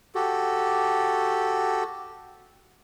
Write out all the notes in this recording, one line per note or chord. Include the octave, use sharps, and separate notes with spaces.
F#4 G4 A4